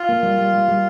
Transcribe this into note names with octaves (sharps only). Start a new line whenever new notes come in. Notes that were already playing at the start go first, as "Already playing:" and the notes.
Already playing: F4
A#3
G3
G3
G3
G3